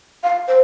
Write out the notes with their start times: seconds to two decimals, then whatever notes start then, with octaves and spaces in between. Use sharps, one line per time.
0.23 F5
0.48 C5